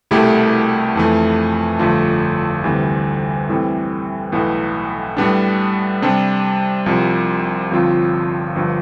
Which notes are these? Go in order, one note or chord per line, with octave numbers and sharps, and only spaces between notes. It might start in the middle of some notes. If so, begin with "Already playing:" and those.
C2 B2 A3 E4 G4
F2 E3 A3
G1 G2 F3 A3
D2 C3 E3 G3
A2 E3 G3 C4
B1 A2 E3 B3
A2 G3 B3 D4
C3 G3 D4
C2 C3 F3
G1 G2 F3 C4 F4
G1 G2 F3 B3